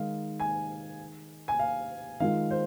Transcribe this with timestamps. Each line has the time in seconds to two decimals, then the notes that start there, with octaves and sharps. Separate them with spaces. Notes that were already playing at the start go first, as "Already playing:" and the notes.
Already playing: D#3 G#3 D#4 F5
0.40 G#5
1.48 G#5
1.59 F5
2.20 D#3 G#3 F4 F5
2.51 C5